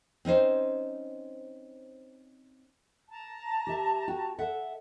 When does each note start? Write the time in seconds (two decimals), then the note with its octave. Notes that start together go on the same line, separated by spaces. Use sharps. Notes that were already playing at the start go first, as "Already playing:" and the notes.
0.25 C4 C#4 D#4 C5
3.10 A5 A#5
3.67 G4 E5
4.08 F#4 G5
4.38 A4 E5 F#5